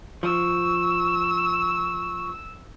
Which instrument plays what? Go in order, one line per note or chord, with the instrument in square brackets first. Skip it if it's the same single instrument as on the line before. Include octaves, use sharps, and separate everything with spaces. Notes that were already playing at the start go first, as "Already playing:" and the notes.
[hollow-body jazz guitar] F3 [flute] C#6 [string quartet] E6